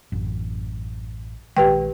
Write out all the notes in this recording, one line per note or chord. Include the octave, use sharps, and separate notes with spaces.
A1 F#2
A#1 D#3 G#3 G4 B4 G5